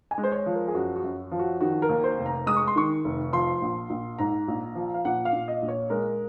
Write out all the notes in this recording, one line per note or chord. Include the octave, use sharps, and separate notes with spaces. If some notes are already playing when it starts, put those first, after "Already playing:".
G#5
G#3
C5
C#5
F3
A#4
G#4
F#2 F#4
F#4
F#2
F3
F#4
D#3 F#4
A#4
D#2
C5
F1
A#5
G#3 D#6
C#6
C6
D#3 C#6
F1
F3 C6
A#1
A#1
G#2 A#5
A#1
F3
F5
A#2 F#5
F5
A#2
D#5
A#1
C#5
G#3 A#4